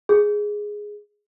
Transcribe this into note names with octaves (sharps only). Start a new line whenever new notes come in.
G#4